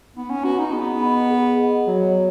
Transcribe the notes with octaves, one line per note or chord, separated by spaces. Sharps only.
B3 D#4
C#4
F#4 B4 G#5 B5
D#4
B3 G#4
D#5 F#5 B5
G#4
D#5 F#5
F#3 F#4